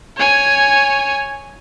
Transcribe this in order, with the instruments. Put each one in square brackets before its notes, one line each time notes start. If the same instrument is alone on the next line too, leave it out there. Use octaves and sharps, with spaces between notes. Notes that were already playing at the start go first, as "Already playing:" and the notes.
[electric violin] C#5 G#5